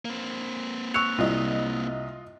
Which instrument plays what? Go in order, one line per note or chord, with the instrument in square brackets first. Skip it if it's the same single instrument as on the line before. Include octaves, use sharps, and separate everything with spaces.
[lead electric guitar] A#3 C4
[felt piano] C#6 C#7 [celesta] E6 F#6 F7
[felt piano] C2 [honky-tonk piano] F4 D#5